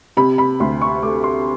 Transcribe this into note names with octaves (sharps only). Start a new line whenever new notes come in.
C3 B5
B5
D2 C6
C#6
A3 D6
C6